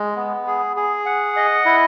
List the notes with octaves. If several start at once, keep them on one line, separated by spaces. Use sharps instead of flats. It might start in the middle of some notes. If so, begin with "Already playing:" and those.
Already playing: G#3
B3
G#4
G#4
F#5
D#5
E4